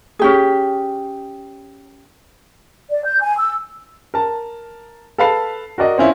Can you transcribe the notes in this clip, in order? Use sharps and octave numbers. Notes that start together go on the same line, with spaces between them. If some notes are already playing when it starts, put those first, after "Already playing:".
C#4 G4 G#4
D5
G6
G#5
E6
A#4 A5
A4 B4 F5 A5 B5 C7
F#4 A#4 D5 D#5
C4 C#4 E4 F4